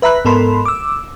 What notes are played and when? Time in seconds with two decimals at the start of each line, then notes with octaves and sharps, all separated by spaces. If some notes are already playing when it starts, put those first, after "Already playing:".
0.02 B4 E5 A#5 B5 F#6
0.25 G#2 B3 A4 A#4 B5 C6
0.65 D6 E6